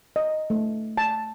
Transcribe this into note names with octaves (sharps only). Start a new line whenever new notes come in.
D#5
A3
A5